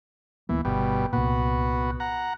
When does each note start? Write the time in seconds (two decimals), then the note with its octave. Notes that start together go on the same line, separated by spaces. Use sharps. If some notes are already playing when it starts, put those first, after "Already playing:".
0.49 D1 E3 A#3 B3
0.65 G1 B2 G3
1.13 C2 A#2 B3 F#4
2.00 F#5 A#5